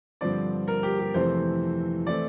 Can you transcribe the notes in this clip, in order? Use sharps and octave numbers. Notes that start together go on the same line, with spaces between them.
G2 D3 F3 C4 D5
A#4
G4
G4
F2 C3 E3 A3 C4 C5
E3 A3 C4 D5